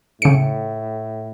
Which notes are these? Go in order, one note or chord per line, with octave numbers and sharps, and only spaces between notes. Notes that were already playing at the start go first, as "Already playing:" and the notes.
A2 C#3 C#7